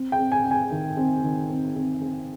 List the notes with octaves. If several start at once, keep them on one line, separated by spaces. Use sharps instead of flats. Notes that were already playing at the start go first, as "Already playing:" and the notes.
Already playing: C4
G5
C4
G#5
C4
G#5
D#3
C4
D#3
C4
C4
C4